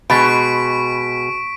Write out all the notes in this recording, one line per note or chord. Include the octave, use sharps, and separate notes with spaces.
B2 G#3 B5 C#6 A6 B6 D7